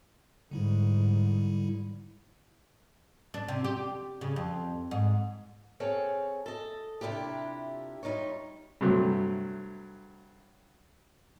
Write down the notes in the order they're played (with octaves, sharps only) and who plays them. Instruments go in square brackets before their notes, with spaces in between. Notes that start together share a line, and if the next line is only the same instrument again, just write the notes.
[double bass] G#2 [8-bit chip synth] D3 G3 E4
[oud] D4
C3
G4
C#3
F2
G#2
[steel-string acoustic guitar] C4 G#4 A4 C#5 F5
A4 D#5
C3 D4 E4 F4 G4
G3 D#4 F4 C#5
[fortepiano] G2 C3 F#3 A3